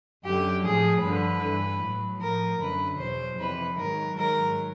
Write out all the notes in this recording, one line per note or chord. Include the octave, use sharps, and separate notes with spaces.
F#2 D3 F#3 G4
A2 F3 G#4
G2 D3 F3 B4
G2 E3
A2 F#3
A2 F3 A#4
F#2 D3 F#3 B4
E2 B2 F#3 C5
F2 C3 E3 B4
G#2 D#3 F#3 A#4
G#2 D#3 F#3 A#4